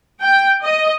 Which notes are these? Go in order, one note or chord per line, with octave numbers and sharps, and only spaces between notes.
G5
D#5